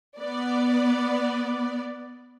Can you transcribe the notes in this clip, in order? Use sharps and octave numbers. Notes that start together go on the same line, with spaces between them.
B3 D5